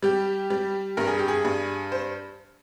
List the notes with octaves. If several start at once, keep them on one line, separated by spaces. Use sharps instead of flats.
G3 G4
G3
G2 A#4
G#4
G4
G#4
G2
C5